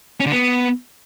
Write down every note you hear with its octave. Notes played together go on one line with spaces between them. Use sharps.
C#4
D3
B3